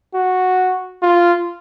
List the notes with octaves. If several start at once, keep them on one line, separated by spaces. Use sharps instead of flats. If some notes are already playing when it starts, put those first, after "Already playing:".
F#4
F4